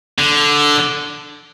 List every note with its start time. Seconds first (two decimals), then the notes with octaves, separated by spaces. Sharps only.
0.18 D3